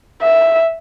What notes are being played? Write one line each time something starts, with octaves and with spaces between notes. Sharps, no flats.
E5